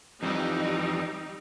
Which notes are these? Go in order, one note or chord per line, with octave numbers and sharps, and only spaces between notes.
F2 E3 G3 D#4